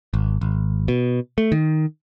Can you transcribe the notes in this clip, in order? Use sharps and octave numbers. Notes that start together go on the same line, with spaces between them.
G#1
G#1
B2
A3
D#3